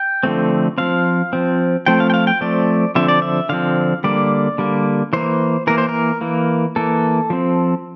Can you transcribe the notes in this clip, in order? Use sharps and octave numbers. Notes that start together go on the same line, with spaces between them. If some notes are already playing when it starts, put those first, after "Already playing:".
Already playing: G5
D3 F3 A3 C4
F3 C4 F5
F3 C4
F3 A3 C4 G5
F5
G5
F5
G5
F3 A3 C4 D5
D3 F3 C4 E5
D5
E5
D3 F3 C4 F5
D3 G3 A#3 D5
D3 G3 A#3
E3 A#3 C5
E3 A#3 A#4
C5
A#4
E3 A#3
E3 A#3 A4
F3 C4